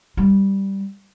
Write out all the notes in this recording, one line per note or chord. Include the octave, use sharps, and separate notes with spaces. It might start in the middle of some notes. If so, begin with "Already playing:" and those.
G3